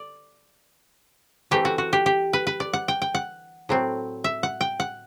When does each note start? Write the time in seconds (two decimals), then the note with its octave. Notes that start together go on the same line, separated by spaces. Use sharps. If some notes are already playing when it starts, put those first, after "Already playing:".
Already playing: D5
1.51 E3 A3 C4 G4
1.65 F#4
1.78 F#4
1.93 G4
2.06 G4
2.33 B4
2.47 B4
2.60 D5
2.73 F#5
2.88 G5
3.02 G5
3.15 F#5
3.69 A2 F#3 C4
4.24 E5
4.43 F#5
4.61 G5
4.80 F#5